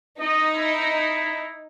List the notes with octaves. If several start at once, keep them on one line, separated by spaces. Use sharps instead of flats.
D#4 D#5
E4